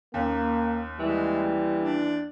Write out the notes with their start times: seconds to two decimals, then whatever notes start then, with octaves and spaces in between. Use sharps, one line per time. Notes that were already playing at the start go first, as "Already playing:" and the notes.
0.14 D#2 A#3 C#4
0.99 E3 G3 G#3
1.77 D4